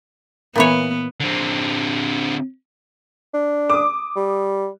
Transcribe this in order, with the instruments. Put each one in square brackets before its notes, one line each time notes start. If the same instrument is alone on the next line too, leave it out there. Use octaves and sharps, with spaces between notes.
[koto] A#2 E3 C#5 [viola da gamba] B3
[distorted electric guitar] D3 C4
[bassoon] D4
[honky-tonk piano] D6 D#6
[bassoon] G3